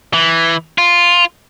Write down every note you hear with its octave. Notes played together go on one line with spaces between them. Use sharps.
E3
F4